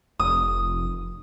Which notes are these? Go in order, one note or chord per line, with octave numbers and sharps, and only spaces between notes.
F1 D#6